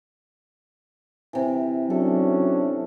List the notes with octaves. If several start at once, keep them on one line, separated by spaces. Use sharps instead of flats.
C3 E3
F#3 C#4 D4 A4